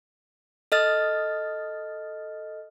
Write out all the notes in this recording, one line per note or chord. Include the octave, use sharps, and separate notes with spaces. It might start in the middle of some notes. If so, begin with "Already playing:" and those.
A4 D#5 F6 A6